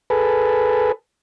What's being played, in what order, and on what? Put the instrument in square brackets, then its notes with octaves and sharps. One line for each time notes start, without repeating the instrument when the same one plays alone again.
[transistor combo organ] G#4 A4 B4